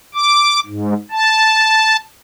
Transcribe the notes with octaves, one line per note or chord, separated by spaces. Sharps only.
D6
G#2
A5